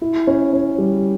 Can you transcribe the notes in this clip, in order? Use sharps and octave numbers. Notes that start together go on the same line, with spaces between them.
E4
C#4
C#4
G3